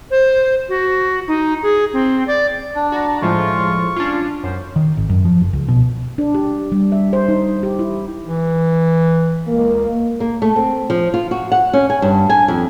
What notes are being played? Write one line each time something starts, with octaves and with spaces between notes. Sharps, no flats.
C5
F#4
D#4
G#4
C4
D5
D4
F#4 D5 A5 A#5
A2 F3 G#3 F4 C#6
C#4 D4 F4
F#2 C#4 C5
D#3
G#1
F#2
F3
F#1
C#2
B2
D4
G4
G3
E5
C5
D#4
G4
E4
E3
C#2 A#3
A#3
A3
C4
F3
F4
F#4
F#5
C#4
G#5
G2
G#5
F2